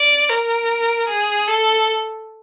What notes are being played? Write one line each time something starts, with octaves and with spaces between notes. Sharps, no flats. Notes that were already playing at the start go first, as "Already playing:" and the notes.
Already playing: D5
A#4
G#4
A4